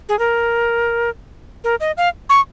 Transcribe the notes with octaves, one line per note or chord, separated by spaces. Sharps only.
G#4
A#4
A#4
D#5
F5
C#6